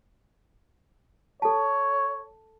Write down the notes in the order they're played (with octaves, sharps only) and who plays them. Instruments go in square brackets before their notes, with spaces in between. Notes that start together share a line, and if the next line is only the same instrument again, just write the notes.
[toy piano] A4 A5 [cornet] C#5